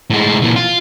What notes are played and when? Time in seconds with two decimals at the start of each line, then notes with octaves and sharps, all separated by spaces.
0.10 A2 G#3
0.42 A#2 E3
0.56 F4